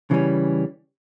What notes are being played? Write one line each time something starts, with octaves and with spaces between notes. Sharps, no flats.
C#3 E3 G3 C#4